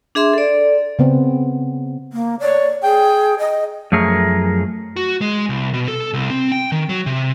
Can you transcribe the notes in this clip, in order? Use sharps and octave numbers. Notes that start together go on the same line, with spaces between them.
D4 G#4 E5 C6
A4 D5
C#3 B3 C4
A#3
C#5 D5
G#4 G5
D#5
F#2 F3 A3 G#4 A#4
F#4
G#3
C2
B2
A4
C2
C4
G5
D#3
F#3
C3